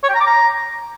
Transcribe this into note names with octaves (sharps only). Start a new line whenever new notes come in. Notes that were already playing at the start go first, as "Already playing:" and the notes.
C#5
G5
A#5
D6
A#5